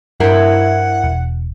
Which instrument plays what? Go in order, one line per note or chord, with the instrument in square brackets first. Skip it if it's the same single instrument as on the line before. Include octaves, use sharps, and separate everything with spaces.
[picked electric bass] G2 [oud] E4 A#4 C5 [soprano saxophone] F#5
[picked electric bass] E1